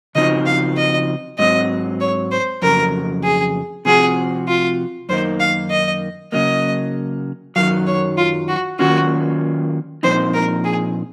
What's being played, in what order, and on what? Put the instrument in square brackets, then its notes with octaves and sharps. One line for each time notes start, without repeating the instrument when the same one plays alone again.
[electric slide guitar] C#3 F3 C4 D#4 F#4 [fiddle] D#5
[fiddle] F5
D#5
[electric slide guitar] G#2 F#3 C4 [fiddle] D#5
[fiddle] C#5
C5
[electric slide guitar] F2 C#3 F#3 [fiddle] A#4
[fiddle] G#4
[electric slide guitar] C3 F3 C4 F#4 [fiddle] G#4
[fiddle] F4
[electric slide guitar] F#2 D#3 A#3 D#4 [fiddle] C5
[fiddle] F5
D#5
[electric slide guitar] C#3 F#3 A#3 [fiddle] D#5
[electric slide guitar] F#2 D#3 F#3 [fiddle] F5
[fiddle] C#5
F4
F#4
[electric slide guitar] D#3 F#3 A#3 C#4 F4 [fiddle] F#4
[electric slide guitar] A#2 F3 C4 D#4 [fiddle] C5
[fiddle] A#4
G#4